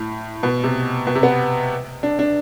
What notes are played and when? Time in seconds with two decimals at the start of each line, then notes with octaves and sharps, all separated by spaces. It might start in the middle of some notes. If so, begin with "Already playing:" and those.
Already playing: A2
0.43 B2
0.64 C3
1.07 B2
1.15 C3
1.23 B3
2.03 D4
2.19 D4